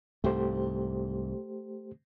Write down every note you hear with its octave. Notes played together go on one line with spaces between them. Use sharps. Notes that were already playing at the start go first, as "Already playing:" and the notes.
C2 G#2 A3 G4 C5